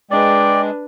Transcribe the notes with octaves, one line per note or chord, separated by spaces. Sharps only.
G#3 D4 B4 D5 G5